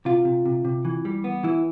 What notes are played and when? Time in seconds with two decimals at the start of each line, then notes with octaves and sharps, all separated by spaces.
0.05 C3 F4
0.25 C3
0.45 C3
0.65 C3
0.85 E3
1.05 G3
1.24 B3
1.43 E3 E4